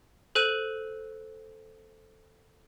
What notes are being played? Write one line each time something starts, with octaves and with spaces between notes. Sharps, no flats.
A4 C5 F#6 D#7 F#7